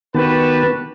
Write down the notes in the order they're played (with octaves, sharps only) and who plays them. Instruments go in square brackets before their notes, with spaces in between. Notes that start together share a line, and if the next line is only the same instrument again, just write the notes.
[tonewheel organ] D#3 B3 A5 [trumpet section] F#4 G4 B4